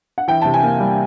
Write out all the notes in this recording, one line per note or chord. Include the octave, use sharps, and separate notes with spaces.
F#5
E3 G5
C3 A5
G#5
A#3
G3